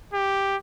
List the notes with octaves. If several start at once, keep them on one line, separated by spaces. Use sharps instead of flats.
G4